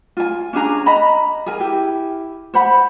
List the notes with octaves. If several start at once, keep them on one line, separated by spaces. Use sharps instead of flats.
F4 G#5
C#4 D4 G#4 A#5
D#5 A#5 B5
G#4 A#4 G#5
E4 G4
C5 F#5 B5